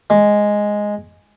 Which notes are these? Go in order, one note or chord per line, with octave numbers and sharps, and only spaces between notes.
G#3